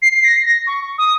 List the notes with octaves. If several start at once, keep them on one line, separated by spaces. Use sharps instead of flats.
C7
C7
A#6
A#6
C#6
D#6